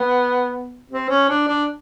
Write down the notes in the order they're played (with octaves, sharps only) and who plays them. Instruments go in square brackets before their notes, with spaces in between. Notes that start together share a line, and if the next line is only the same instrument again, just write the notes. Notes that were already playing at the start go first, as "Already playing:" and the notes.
Already playing: [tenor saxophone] B3
C4
C#4
D4
D4